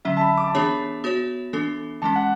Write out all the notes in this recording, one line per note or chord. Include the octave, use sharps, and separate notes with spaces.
D3 F#3 C#4 E5
A5
B5
D6
A5
E3 B3 D4 G#4 C#5 B5
B3 F#4 C#5
E3 B3 D4 A4
E3 G#3 C#4 A5
F#5